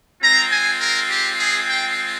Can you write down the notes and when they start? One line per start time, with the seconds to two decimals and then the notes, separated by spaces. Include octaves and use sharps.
0.21 G#3 C4 F4 A#5
0.51 G#5
0.80 A#4
1.10 G4
1.39 G#4
1.69 G5